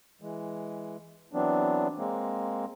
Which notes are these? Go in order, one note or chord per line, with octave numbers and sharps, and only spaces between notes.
E3 G#3
E3 F#3 B3 C4 D4
G#3 A#3 C4